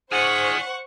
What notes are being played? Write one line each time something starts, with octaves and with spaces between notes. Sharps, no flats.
D#4 G#4 C5 D5 F#5 G#5 C#6 F6